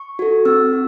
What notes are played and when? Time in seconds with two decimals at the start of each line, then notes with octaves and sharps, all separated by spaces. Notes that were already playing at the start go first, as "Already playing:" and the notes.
Already playing: C#6
0.19 F#4 A4
0.45 C4 E6
0.73 F#4